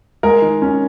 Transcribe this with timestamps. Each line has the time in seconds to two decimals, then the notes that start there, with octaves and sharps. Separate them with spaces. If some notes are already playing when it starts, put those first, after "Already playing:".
0.23 G#3 A#4
0.42 D#3
0.62 C#4